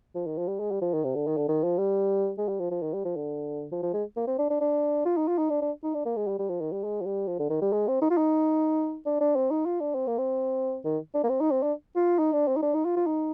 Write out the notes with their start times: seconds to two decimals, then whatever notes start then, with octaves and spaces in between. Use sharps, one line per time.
0.15 F3
0.26 D#3
0.38 F3
0.48 G3
0.59 G#3
0.71 G3
0.82 F3
0.93 D#3
1.04 C3
1.15 D3
1.27 D#3
1.37 D3
1.49 D#3
1.64 F3
1.78 G3
2.38 G#3
2.48 G3
2.60 F3
2.71 F3
2.82 D#3
2.94 G3
3.05 F3
3.16 D3
3.72 F3
3.83 F3
3.94 G#3
4.16 A#3
4.27 C4
4.38 D4
4.50 D4
4.61 D4
5.05 F4
5.17 D#4
5.28 F4
5.38 D#4
5.50 D4
5.62 D4
5.83 D#4
5.94 D4
6.05 A#3
6.17 G#3
6.28 G3
6.39 G3
6.49 F3
6.61 D#3
6.72 G3
6.84 G#3
7.01 F3
7.06 G3
7.28 F3
7.39 D3
7.50 D#3
7.61 G3
7.72 G#3
7.88 C4
8.02 D#4
8.10 F4
8.17 D#4
9.06 D4
9.21 D4
9.36 C4
9.51 D#4
9.66 F4
9.80 D4
9.95 C4
10.07 A#3
10.18 C4
10.85 D#3
11.14 D4
11.24 A#3
11.29 C4
11.40 D#4
11.51 C4
11.63 D4
11.96 F4
12.19 D#4
12.32 D4
12.48 C4
12.56 D#4
12.62 D4
12.74 D#4
12.85 F4
12.96 F4
13.07 D#4